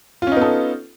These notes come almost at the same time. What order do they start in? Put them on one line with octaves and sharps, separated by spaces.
F4 C#4 D#4 B3 A4